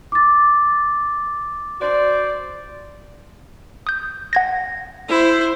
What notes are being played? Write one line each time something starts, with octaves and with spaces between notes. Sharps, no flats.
D6 A6
F#4 C5 D5
D#6 G6
F#5 G#6 A#6
E4 C5